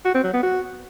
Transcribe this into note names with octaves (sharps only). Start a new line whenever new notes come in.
F#4
C4
F#3
B3
F#4